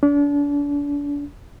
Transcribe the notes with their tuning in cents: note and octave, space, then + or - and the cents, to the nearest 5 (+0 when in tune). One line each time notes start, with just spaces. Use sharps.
D4 -35